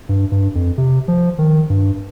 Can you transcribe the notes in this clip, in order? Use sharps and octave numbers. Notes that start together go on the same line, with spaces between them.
G2
G2
F2
C3
F3
D#3
G2